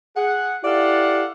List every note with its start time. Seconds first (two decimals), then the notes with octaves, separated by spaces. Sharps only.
0.17 G#4 F#5
0.64 E4 G4 A4 D5 F5 F#5